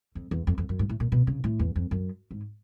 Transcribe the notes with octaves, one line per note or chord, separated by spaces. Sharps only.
F2
E2
F2
F2
F#2
G#2
A2
A#2
B2
C#3
A2
E2
F2
F#2
G#2